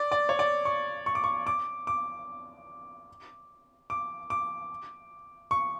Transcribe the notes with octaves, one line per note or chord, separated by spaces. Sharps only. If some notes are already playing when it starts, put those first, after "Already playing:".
Already playing: D5
D5
C#5
D5
C#6
C#6
D6
C#6
D6
D6
D6
D6
C#6